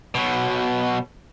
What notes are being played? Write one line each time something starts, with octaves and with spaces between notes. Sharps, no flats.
B2 F#3